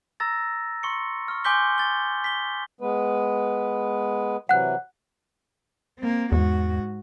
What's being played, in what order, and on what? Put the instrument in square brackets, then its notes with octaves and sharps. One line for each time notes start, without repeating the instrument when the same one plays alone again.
[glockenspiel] A#5 E6 A6 A#6
C6 C#6 C#7
C#6 F6
G#5 C6 D6 G6 B6 G7
A6 G7
B6 G7
[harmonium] G#3 B3 B4
[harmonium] C3 E3 F#3 [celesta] F#5 F#6
[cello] A#3 C4
[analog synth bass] E2 [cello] G#2 F#4